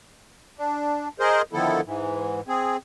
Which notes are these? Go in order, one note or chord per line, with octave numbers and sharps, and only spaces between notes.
D4
G#4 A#4 C5 D#5
D3 D#3 F3 B3 E4 A4
G#2 E3
C4 G#4